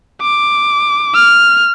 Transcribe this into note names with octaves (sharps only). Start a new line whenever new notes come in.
D6
F6